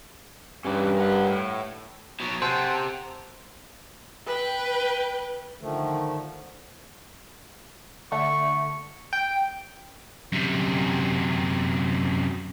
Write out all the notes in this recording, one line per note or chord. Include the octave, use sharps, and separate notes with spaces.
G2 C#4 G4 B4
A#4 F#5
A2
B2 F#3
C3 A4 C5 F#5 G#5
B4 G5
D3 D#3 F3 A3
D3 A3 C#6
G5
F#2 C3